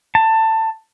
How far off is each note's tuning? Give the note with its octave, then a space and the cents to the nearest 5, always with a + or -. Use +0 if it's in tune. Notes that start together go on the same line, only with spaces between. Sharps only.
A5 +20